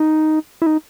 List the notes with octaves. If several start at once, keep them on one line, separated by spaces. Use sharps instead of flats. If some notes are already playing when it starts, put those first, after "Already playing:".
Already playing: D#4
E4
D#4